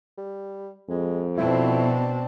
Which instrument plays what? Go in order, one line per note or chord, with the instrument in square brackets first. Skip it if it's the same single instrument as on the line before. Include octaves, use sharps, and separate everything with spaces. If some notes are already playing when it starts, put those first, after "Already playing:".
[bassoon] G3
[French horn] F2 [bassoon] G#3
[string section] B2 [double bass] C4 D4 [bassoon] E4